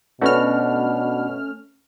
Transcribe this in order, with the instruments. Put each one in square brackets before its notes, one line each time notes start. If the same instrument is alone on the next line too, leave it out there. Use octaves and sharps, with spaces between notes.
[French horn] B2 [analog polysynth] A3 C#4 F6 [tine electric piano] D4 F#4 B4